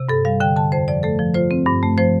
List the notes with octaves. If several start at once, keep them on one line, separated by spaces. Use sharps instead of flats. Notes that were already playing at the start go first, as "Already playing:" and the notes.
Already playing: C3
G2 A4
G3 F5
D3 G5
D3 A5
F2 C5
F3 D5
A3 A4
F3
F4 C5
C4
G2
A3
F3 C5